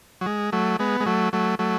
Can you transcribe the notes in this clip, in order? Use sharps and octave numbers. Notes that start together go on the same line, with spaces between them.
F#3
G#3
F#3 A3
G#3 B3
G#3
F#3 A3
F#3 A3
F#3 A3